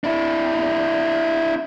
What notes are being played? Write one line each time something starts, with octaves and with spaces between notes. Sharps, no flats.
D4 E4